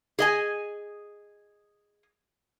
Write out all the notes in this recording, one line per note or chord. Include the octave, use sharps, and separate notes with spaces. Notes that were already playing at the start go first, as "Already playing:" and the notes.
G#4 D#5 G#5